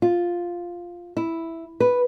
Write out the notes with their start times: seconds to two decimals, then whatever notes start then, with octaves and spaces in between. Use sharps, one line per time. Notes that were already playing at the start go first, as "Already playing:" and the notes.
0.02 F4
1.17 E4
1.80 B4